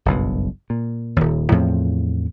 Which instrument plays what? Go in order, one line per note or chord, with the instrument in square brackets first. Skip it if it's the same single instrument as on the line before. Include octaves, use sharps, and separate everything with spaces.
[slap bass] F#1 B1 G2
A#2
D#1 D#2
E2 A2 F3 C4